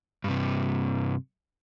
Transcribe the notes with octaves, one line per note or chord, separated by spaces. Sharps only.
G2 C3